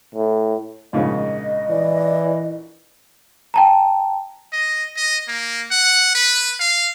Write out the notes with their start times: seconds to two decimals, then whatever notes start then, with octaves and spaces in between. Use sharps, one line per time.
0.15 A2
0.93 A#1 G#2 C#3 D#5
1.70 E3 D5
3.54 G5 A5 A#5
4.52 D#5
4.96 D#5
5.28 A#3
5.70 F#5
6.15 B4
6.60 F5